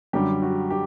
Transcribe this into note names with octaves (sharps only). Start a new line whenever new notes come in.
F#2 D3 G3 G4
F#4
G4